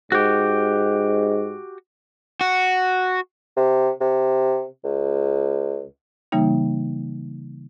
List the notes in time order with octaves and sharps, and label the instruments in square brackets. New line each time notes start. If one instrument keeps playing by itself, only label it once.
[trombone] G#2 [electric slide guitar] F#4 G4
[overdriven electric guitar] F#4
[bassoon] C3
C3
C#2
[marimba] C#3 E3 G3 A#3 D#4